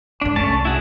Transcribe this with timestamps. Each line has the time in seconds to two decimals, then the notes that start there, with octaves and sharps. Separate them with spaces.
0.21 F#1 G#2 D4
0.36 C2 A3 C#4 A5
0.65 E4 F#4 G#4